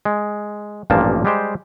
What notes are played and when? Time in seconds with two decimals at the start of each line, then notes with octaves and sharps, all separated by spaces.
0.05 G#3
0.90 A1 G2 A#2 F3 A#3 A5
1.25 G3 G#3 G4 C5